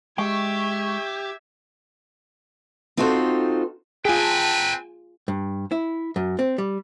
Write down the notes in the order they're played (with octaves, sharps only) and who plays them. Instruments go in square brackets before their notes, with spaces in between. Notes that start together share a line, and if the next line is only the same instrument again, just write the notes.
[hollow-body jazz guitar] G#3 G5 [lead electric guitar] G4 [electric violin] E5 G#6 [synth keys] C#6
[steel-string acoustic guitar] C4 D#4 F4 F#4 A4 C5
[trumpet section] C4 B4 [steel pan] F4 G#4 [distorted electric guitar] G5 G#5
[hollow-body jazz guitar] G2
E4
F#2
C4
G3